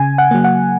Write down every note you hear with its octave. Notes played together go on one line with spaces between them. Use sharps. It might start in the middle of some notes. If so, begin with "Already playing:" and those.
Already playing: C#3 G#5
F#5
F#3 A#3
F#5